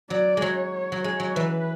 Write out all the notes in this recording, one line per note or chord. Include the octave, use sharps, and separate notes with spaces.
F#3 D5
F#3 G#3 C#5
F#3
G#3 C#5
F#3
E3 B4